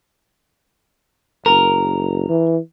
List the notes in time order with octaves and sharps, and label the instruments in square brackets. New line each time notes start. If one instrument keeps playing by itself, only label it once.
[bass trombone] F#1 [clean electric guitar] A#4
[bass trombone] E3